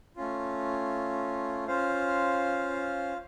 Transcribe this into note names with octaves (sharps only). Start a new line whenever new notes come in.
A3 C#4 F4
C#4 F4 C5 F5